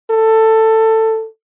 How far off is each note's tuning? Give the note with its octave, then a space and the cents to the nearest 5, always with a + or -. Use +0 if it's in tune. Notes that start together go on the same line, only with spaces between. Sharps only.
A4 +15